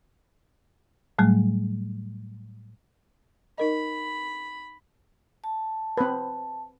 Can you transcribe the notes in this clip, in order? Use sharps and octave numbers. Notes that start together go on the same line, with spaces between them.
A2 F#3 G3 A3
D#4 A#4 D#5 B5
A5
C4 B4